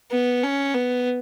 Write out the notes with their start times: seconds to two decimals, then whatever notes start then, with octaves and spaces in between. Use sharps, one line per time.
0.11 B3
0.43 C#4
0.74 B3